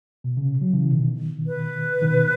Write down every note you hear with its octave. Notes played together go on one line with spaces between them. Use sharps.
B2
C#3
F#3
C#3 E3
B2 D#3
B4
B2 D#3